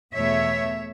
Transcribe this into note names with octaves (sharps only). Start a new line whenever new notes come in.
E2 B2 A3 C#5 E5